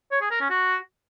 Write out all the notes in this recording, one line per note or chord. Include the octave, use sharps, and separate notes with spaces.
C#5
G#4
A#4
C#4
F#4